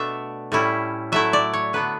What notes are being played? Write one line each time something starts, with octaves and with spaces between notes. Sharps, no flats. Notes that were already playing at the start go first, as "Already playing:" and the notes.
Already playing: B2 A3 D4 E5
A2 G3 C#4 E4
F#3 A3 E4 E5
D5
C#5
D3 F#3 B3 D4 B4